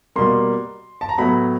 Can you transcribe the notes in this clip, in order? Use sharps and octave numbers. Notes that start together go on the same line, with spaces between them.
B2 G3 A#3 C6
A5
A#5
A2 F#3 B3 B5